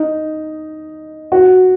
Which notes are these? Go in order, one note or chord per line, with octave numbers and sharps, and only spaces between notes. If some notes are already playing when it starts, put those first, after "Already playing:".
Already playing: D#4
F#4